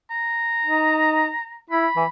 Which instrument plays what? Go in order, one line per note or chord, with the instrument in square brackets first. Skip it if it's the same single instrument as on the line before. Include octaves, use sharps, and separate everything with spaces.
[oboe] A#5
[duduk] D#4
[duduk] E4 [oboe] B5
[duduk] E3